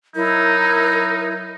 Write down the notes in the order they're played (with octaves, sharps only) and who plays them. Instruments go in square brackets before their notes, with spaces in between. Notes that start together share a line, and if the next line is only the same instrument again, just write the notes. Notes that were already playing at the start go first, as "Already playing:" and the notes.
[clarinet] F#3 [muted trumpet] D#4 [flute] E4 [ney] A#4